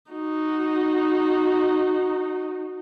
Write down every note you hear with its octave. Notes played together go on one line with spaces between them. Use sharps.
D#4 F#4